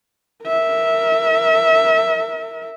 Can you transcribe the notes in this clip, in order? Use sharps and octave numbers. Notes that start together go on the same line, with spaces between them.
A#4 E5